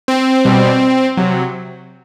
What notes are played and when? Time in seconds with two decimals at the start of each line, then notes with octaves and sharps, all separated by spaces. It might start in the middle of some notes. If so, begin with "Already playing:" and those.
0.08 C4
0.45 B2 G3
1.17 C3 F#3